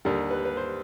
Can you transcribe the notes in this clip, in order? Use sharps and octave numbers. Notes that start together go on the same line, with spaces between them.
D#2 D3 G3 A#4
B4
B4
C5